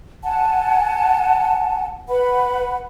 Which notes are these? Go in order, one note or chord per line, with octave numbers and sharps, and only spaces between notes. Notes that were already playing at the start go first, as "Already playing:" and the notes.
F#5 G#5 A5
B4 F#5 B5